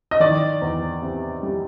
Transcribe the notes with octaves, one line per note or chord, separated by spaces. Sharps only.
D#5
D#3 D5
E2
C3
G3